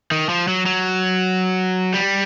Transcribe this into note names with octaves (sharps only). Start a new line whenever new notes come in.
D#3
F3
F#3
F#3
G3